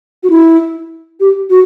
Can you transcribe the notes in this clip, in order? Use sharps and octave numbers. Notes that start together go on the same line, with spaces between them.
F#4
E4
G4
F#4